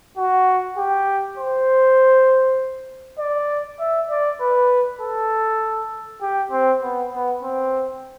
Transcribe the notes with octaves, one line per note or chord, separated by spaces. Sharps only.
F#4
G4
C5
D5
E5
D5
B4
A4
G4
C4
B3
B3
C4